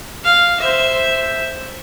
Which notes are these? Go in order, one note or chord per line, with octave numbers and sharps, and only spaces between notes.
F5
C5 E5